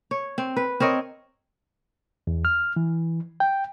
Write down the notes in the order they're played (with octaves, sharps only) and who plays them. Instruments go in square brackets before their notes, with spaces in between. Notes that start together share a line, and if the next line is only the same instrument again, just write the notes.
[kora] C#5
C4
B4
C4 A#4 C#5 D#5
[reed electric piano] E2
F6
E3
G5